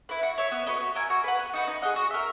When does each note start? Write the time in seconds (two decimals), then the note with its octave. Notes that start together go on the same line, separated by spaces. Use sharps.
0.09 E4 B4
0.23 F#4
0.38 C#5 E5
0.52 B3
0.67 F#4 B4 D#5
0.80 F#4
0.95 A#4 E5 G#5
1.10 F#4
1.24 B4 F#5
1.39 B3
1.54 D#4 F#4 B4
1.67 D#4
1.82 G#4 D#5 F#5
1.96 F#4
2.11 A#4 E5